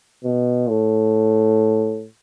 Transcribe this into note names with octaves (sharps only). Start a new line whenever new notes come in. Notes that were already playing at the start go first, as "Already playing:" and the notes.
B2
A2